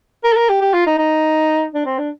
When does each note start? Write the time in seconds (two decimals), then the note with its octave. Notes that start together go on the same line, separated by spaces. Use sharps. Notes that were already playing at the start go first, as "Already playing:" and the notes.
0.24 A#4
0.33 A4
0.37 A#4
0.49 G4
0.61 G4
0.74 F4
0.87 D#4
0.98 D#4
1.74 D4
1.86 C4
1.98 D4